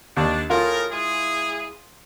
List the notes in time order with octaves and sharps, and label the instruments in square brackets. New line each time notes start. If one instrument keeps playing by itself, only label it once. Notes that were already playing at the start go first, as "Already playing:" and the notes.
[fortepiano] D#2 [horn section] D4
[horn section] A2 G#4 A#4 [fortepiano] F4
[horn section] G#3 E4 G#4